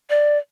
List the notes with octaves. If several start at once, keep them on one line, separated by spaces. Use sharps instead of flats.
D5